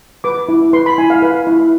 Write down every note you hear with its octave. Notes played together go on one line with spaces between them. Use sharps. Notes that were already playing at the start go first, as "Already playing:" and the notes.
B4 D6
E4
B4 C6
B5
E4 G#5
F5
B4
E4